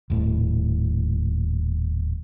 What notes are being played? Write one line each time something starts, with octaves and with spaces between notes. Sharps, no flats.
D#1 A2